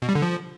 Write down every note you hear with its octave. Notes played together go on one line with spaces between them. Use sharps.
B2
G3
D3
F3